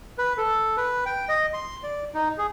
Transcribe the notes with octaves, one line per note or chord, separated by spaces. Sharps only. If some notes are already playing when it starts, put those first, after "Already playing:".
B4
A4
B4
G5
D#5
C6
D5
D#4
G#4